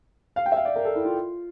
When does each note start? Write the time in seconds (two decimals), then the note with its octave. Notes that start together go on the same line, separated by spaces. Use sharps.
0.36 F5
0.46 G5
0.52 E5
0.56 F5
0.65 D5
0.76 A#4
0.85 A4
0.95 E4
1.05 F4